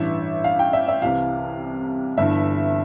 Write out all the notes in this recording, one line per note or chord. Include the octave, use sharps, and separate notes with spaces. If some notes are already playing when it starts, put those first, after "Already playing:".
Already playing: A1 G2 E3 E5
F5
G5
E5
E5
C2 C3 E3 F5
G1 G2 E3 E5